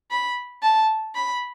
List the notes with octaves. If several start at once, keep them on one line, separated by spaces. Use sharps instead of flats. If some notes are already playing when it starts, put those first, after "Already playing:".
B5
A5
B5